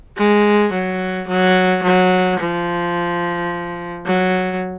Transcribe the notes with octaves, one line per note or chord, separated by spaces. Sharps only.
G#3
F#3
F#3
F#3
F3
F#3